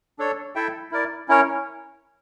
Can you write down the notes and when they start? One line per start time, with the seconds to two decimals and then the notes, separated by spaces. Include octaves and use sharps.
0.19 D4 A4 C#5
0.55 E4 A4 E5 G5
0.91 E4 A#4 D5
1.28 C#4 E4 A#4 C#5